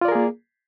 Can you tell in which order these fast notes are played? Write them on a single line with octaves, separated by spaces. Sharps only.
F4 D5 A#4 G#4 A#3